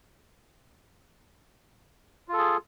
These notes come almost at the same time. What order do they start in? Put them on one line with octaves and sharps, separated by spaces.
F4 A4 G#4